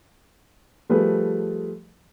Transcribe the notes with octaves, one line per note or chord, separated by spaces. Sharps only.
F3 G3 A3 G#4 B4